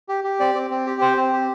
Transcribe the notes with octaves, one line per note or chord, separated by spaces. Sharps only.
G4
G4
C4 D5
C4
C4
G4
C4 C5
C4
G4